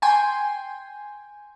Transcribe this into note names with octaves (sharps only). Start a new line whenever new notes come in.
G5 G#5 C6